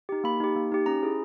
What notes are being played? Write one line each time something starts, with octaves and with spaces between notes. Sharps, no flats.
D#4 G4
A#3 B5
D#4 G4
A#3
D#4 G4
C#4 A#5
E4 G#4